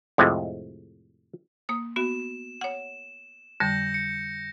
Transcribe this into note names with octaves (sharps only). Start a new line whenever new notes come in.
F2 A2 C3 G#3
A#3 D#6
B3 F#4 E7
C#5 F#5
F2 D3 G3 G6 A#6 C#7
C#7